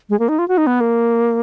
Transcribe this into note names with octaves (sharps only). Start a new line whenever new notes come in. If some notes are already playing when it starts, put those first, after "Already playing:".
G#3
A#3
D#4
F4
F#4
D#4
B3
A#3